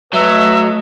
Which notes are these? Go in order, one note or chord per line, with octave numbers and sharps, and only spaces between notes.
F#3 A3 B4 D#5 E5